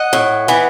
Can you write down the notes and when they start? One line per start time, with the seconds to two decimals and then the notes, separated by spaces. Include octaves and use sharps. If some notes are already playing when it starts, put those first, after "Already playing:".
Already playing: D#5 F#5
0.13 A2
0.48 E3 B3